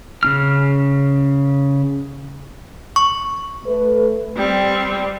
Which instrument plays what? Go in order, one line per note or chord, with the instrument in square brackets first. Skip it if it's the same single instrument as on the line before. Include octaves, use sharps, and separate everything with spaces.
[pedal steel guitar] C#3 D4 F6
[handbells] C#6
[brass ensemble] A3 B4
[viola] G3 C4